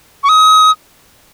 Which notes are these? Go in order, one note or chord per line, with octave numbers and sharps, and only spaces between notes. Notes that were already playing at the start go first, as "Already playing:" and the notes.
C#6
D#6